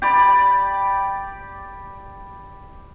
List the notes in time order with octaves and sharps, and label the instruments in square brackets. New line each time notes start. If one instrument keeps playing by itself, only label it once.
[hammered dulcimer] G4 D5 B5